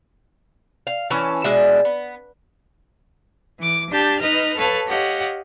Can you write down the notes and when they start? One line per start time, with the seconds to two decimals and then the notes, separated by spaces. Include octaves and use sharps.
0.87 F5
1.10 E3 C#4 A5
1.44 B2 G#3 D4 E5
1.85 B3
3.60 E3 D6
3.90 D4 G4 A5 G6
4.21 D#4 B4 D#5 F6
4.57 A4 B4 C#5 F5 A5
4.87 G4 C#5 D#5 F5 F#5